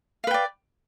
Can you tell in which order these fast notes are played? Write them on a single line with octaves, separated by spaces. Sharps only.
F5 B4 G5 D5